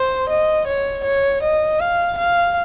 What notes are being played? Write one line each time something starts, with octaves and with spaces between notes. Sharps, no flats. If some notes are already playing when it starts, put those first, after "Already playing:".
Already playing: C5
D#5
C#5
C#5
D#5
F5
F5